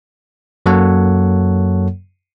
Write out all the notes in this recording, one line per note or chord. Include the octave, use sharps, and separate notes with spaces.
F#2 F#3 A#3 A4 C#5 F#5